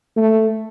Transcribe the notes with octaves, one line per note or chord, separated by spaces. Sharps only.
A3